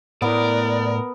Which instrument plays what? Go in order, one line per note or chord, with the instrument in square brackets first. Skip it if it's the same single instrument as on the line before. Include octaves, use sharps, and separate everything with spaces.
[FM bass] A2 [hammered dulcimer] B3 [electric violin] A#4 [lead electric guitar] D5